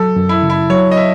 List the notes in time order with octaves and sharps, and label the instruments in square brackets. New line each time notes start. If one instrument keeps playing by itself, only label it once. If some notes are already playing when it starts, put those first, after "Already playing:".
Already playing: [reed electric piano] F#3 [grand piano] A4
[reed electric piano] F#2
[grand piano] E4
[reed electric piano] C#3
[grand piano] E4
[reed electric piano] F#3 [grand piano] C#5
[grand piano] D#5
E5